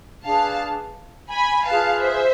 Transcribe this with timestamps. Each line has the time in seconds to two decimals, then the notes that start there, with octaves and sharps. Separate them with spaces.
0.25 D4 G#4 B4 F5 A5
1.31 G#5 B5
1.67 F4 G#4 B4 F5 A5
2.02 C5 E5